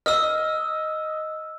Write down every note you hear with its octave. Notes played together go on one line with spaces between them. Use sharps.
D#5 E6 F6